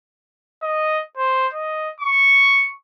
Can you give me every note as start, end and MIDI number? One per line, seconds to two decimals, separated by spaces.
0.63 1.03 75
1.17 1.47 72
1.53 1.90 75
2.00 2.71 85